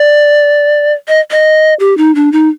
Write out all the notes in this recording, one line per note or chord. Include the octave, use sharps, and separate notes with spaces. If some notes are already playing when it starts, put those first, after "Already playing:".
Already playing: D5
D#5
D#5
G4
D#4
D4
D#4